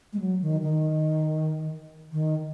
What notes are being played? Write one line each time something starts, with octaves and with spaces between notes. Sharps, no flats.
G#3
F#3
D#3
D#3
D#3